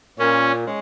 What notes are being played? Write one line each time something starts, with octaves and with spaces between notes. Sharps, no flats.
A#2 C#4
G#3 C#4